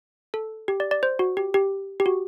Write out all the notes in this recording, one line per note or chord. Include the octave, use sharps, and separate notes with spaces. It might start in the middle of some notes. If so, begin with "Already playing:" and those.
A4
G4
D5
D5
C5
F#4
G4
G4
G4
F#4